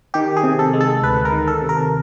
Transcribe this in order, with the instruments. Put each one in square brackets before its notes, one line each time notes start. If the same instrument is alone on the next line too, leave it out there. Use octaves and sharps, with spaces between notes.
[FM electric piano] D#3 G4
G#4
C3
A4
G#3
A4
D2 B4
A#4
D#3
A4
C3
A#4